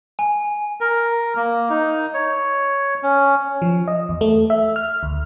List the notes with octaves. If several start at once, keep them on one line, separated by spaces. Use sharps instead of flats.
G#5
A#4
A#3
D#4
C#5
C#4
F3
D#5
E2
A3
E5
F6
D2